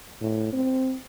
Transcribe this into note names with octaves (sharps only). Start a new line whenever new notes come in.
A2
C4